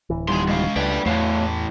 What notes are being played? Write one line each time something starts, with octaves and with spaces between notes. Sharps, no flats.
D1 E3
D#3 G3 G#5 C6
G#3 F5
C#2 A3 D4 B4 D5 G5
E2 A2 E3 A3 C#5 F5